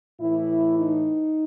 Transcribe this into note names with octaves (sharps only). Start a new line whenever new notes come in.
A2 E3 E4
D#4